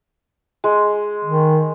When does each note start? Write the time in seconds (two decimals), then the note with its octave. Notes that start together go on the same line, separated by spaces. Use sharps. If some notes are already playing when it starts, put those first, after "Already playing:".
0.64 G#3
1.25 D#3